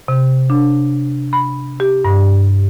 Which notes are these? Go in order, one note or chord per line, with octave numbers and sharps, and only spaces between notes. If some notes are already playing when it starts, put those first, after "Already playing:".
C3
D4
B5
G4
G2